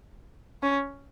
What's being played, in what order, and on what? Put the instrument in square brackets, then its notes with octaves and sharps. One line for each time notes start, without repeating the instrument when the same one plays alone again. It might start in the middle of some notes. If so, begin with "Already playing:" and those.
[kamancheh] C#4